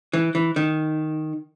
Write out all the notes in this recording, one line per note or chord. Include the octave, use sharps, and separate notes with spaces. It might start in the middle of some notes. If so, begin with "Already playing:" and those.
E3
E3
D#3